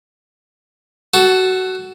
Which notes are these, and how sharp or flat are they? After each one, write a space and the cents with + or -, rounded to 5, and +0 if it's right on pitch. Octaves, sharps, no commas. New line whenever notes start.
F#4 +20 A4 +0